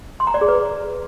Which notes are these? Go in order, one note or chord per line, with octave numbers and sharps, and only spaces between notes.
C6
A#5
D5
G#4
B4